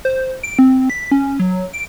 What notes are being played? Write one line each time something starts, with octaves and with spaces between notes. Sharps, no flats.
C5
D7
C4
B6
C#4
F#3
D7